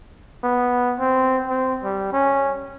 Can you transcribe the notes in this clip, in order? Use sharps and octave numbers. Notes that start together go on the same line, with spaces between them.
B3
C4
C4
G3
C#4